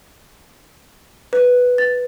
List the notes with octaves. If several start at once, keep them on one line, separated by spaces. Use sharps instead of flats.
B4
A6